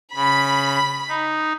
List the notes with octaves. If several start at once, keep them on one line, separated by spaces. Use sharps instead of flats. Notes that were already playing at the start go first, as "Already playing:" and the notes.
C#3 B5
D#4